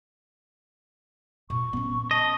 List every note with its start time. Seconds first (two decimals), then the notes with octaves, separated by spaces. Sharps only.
1.50 A#2 C#6
1.73 B3 C#4
2.11 D#5 A5